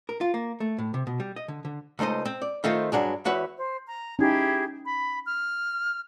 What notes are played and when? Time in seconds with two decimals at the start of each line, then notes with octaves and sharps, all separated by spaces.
0.09 A#4
0.21 F4
0.34 A#3
0.60 A3
0.78 A2
0.94 C3
1.07 B2
1.20 G3
1.36 D#5
1.48 D3
1.65 D3
1.99 C#2 A3 D#4 C5 D#5
2.25 C4
2.42 D5
2.64 D#3 A3 C4 F4
2.92 G2 F#3 D4 G#4
3.25 E2 F#4 B4 C#5 E5
3.56 C5
3.86 A#5
4.19 C#4 D#4 E4 G4 G#4
4.84 B5
5.25 F6